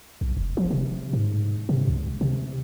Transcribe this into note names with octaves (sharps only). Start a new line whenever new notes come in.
B1
F1
F3
C3
G#2
C3
C#2
C3